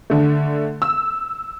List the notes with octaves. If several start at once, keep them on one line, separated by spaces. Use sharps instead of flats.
D3 A3
E6